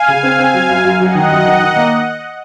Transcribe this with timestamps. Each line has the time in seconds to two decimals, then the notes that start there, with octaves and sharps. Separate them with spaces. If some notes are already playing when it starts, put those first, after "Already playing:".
Already playing: F5 G#5
0.08 C#3
0.23 C4
0.39 C4
0.54 F#3
0.69 F#2
0.85 F#2
0.99 F#3 D#5 F#5
1.15 D#3
1.31 F#2
1.46 D#3
1.61 D#3
1.76 A#3